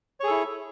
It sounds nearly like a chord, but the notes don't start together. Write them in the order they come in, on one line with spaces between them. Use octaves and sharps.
C#5 G#4 A4 E4